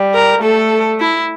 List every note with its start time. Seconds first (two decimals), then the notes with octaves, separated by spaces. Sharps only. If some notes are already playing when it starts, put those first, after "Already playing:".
Already playing: G3
0.14 A#4
0.42 A3 A4
1.00 E4